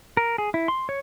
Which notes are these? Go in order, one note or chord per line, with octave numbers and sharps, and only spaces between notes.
A#4
G#4
E4
C6
C#5